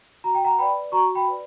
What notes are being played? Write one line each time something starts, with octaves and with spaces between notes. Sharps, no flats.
F#4 A#5
G5
F#5 A#5
B4 D5 G5 B5
F#4 A#5 C#6
G5 B5
B4 D5